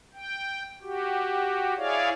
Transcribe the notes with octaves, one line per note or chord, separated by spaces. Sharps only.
G5
F#4 G4
E4 G#4 C#5 D5 F5